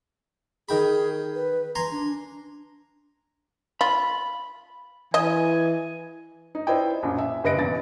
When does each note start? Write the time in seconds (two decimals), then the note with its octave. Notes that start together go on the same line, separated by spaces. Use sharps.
0.69 D#3 G#4 G5 B5
1.35 B4
1.75 G#5 A#5 C6
1.92 D4
3.81 F4 B5
5.14 E3 D#5 G#5
6.55 D#4
6.67 E4 B4 C5 D5 D#5 G5
7.03 A#1 F#2
7.18 E5
7.43 F#1 G2 B4 D#5 A#6 D7
7.59 A1 E2 A6